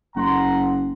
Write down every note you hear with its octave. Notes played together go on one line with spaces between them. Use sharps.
F#1 F#5 A#5 C6